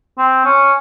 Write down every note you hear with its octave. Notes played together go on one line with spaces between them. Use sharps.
C4
C#4